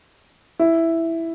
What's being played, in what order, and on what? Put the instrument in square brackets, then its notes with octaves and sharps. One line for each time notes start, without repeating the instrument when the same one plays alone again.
[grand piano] E4